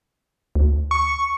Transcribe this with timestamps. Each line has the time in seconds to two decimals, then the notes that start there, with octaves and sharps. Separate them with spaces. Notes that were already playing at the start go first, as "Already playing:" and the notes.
0.55 D2
0.91 C#6